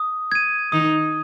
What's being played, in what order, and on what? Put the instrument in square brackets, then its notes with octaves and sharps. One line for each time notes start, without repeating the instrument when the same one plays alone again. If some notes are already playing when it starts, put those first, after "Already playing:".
Already playing: [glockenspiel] D#6
G#6 D#7
[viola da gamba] D#3 D#4 [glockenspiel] D#6